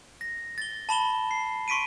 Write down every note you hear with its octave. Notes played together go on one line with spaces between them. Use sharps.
A#6
A6 G7
A5 B5 E7 G7
C7
C6 C#6 B6 D7 D#7